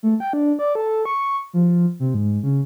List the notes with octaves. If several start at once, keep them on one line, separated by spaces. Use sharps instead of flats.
A3
G5
D4
D5
A4
C#6
F3
C3
G#2
C#3